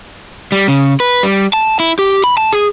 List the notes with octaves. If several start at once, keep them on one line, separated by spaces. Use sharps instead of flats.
G3
C#3
B4
G3
A5
E4
G4
B5
A5
G#4